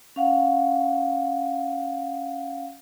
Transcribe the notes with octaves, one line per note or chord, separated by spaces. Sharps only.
C#4 F5 F#5